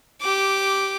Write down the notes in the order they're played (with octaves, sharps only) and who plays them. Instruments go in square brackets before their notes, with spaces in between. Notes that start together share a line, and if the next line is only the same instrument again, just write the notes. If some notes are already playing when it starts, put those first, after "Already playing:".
[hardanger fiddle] G4 D6